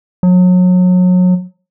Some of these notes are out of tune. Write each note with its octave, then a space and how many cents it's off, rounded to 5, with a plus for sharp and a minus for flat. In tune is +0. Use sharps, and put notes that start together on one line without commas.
F#3 -30